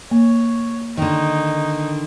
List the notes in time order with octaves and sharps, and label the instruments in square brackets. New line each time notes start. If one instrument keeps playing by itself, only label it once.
[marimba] A#3 [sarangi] C#5
[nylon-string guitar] D3 D#3 [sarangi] D#4